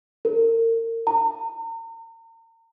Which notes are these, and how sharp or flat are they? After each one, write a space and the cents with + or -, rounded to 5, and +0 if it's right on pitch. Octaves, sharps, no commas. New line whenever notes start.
A#4 -35
A#5 -40